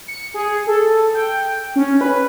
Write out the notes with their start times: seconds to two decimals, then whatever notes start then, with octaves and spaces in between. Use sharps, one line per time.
0.08 C#7
0.34 G#4
0.67 A4
1.14 G5
1.76 C#4
2.01 B4